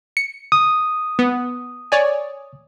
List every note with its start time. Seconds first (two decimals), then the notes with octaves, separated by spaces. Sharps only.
0.17 C#7
0.52 D#6
1.19 B3
1.92 C#5 D5 G#5